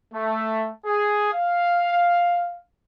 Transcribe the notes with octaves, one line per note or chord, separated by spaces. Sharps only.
A3
G#4
F5